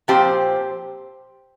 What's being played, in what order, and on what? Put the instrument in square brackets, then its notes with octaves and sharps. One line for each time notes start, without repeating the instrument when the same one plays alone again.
[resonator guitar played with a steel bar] A#2 F3 C4 G4 C5